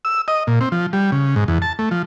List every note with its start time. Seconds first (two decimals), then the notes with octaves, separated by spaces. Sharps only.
0.05 E6
0.28 D#5
0.47 A#2
0.61 C4
0.72 F3
0.93 G3
1.12 C#3
1.36 G#2
1.48 E2
1.62 A5
1.79 A3
1.91 F3